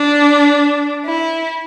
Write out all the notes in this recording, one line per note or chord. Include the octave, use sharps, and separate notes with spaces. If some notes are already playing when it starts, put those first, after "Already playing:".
Already playing: D4
E4